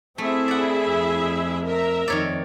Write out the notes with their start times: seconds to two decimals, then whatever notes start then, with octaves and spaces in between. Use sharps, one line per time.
0.18 A3 C4 E4 G#4 E5
0.48 D5 F#5
0.84 F2
1.65 A#4 E5 A#5
2.08 F2 D#3 C#5 D5